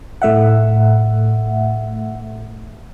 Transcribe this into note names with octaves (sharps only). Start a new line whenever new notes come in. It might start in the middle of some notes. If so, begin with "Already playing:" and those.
A2 A3 E5 F#5